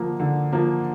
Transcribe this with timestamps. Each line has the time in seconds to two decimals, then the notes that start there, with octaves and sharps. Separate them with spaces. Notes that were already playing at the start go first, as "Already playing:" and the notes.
Already playing: D3 F3 A#3
0.20 D3
0.53 F3 A#3